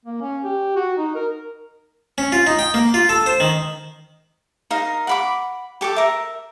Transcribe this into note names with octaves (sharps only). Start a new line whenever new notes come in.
A#3
C#4
G4
F#4
D#4
A#4
C#4
F4
D#4
G5
A#3
F4
A4
C5
D#3
D#4 A#4 F5
F#5 B5 D6
G4 A4 A5 D6
A#4 E5